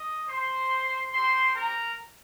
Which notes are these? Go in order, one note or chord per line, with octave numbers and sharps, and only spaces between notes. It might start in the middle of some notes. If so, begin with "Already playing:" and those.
Already playing: D#5 D#6
C5 C6
C4 G4 C5 C6
A#4 A#5